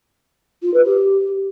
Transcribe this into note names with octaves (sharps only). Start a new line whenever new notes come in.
F4
B4
G4